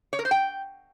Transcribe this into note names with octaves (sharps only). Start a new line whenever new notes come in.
C#5
A#4
C5
G5